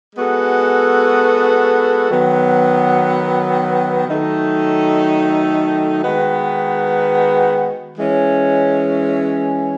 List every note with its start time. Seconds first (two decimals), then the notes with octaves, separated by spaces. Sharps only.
0.16 G#3 B3 F#4 A4
2.11 D#3 F#3 B3
4.06 D#3 F#3 A3 D#4 A4
6.02 D#3 G#3 B3 F#4 B4
7.98 E3 G#3 C#4